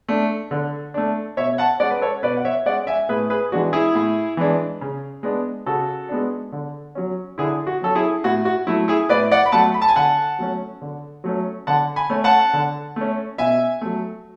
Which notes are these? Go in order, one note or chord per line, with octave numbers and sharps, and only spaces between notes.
A3 D4
D3
A3 D4
B2 C#5 E5
F#5 A5
G#3 C#4 D5 F#5
B4
A4 C#5
B2 B4 D5
F#5
C#5 E5
G#3 C#4 D5 F#5
E5 G#5
A2 G#4 B4
G#4 B4
E3 G#3 D4 F#4
E4 G#4
A2
E3 G#3 D4
C#3
G#3 B3 D4
C#3 F#4 A4
G#3 B3 D4
D3
F#3 C#4
D3 E4 G#4
F#4
F#3 C#4 A4
E4 G#4
A2 F#4
F#4
F#3 A3 E4
E4 G#4
A2 B4 D5
D5 F#5
B5
F#3 A3 F#5 A5
B5
A5
G#5
D3 F#5 A5
F#3 A3 C#4
D3
F#3 A3 C#4
D3 F#5 A5
G#5 B5
A3 C#4
F#5 A5
D3
A3 C#4
B2 E5 G#5
F#3 A3